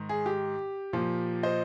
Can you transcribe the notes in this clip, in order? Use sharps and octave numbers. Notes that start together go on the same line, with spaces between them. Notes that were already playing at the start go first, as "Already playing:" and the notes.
Already playing: G#2 D#3
G#4
G4
A#2 F3
C5 D#5